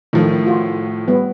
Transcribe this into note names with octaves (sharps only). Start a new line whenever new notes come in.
A2 D#3 F3 A3
F4 F#4
G3 B3